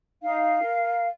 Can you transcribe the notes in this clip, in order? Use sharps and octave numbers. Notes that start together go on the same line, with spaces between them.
D#4 F5
A#4